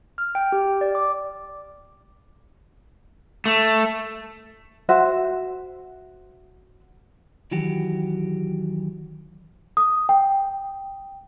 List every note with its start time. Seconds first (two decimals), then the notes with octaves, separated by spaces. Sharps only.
0.18 F6
0.35 G5
0.52 G4
0.81 D5
0.95 D6
3.46 A3
4.89 F#4 C5 E5
7.51 D#3 E3 F#3 F#4 G4
9.77 D#6
10.09 G5